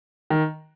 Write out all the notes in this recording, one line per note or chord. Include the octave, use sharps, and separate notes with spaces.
D#3